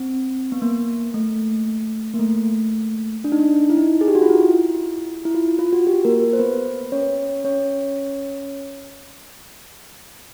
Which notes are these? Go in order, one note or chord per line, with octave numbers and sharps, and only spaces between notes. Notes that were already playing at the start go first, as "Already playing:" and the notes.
Already playing: C4
B3
A#3
A3
A#3
A3
D4
D#4
D4
E4
D#4
G#4
G4
F#4
F4
E4
E4
F4
F4
F#4
G4
A#3 A#4
C5
B3 B4
C#4 C#5
C#4 C#5